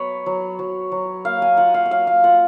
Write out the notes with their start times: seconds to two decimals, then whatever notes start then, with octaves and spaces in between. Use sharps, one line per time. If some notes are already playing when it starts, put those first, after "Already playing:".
Already playing: F#3 B3 B4 C#5
0.26 F#3
0.59 F#3
0.92 F#3
1.25 A#3 F5
1.42 G#5
1.57 F4 F#5
1.74 F5
1.86 F#5
1.91 F#3 F5
2.07 F5
2.24 F4 F#5